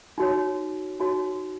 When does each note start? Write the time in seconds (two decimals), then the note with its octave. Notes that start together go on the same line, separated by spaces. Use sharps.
0.18 D#4 F#4 C#5
0.99 D#4 F#4 C#5